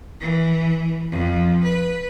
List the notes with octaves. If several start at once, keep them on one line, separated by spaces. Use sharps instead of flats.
E3
F2
B4